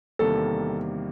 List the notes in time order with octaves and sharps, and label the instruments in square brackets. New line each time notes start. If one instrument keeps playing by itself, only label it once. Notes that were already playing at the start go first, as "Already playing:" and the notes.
[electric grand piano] E2 C3 D#3 G3 A#3 [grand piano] A4